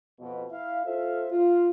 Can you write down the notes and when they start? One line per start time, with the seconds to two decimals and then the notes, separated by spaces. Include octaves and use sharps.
0.19 F2 B2
0.51 E4 E5 F5
0.85 F4 A4 C5 E5 F5
1.31 F4